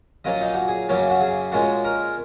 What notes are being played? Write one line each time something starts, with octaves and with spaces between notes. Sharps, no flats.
A#2 F#3 A#3 C#4 D#5
D#4
F#4
G#4
F#2 C#3 F#3 A#3 C#4
F#4
G#4
A#2 G#3 C#4 F#4
A#4